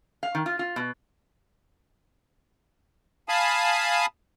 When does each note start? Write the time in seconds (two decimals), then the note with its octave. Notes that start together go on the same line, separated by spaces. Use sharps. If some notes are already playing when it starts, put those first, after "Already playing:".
0.23 F5
0.35 D#3
0.46 F4
0.59 F4
0.76 B2
3.29 F5 G#5 A5 B5 D#6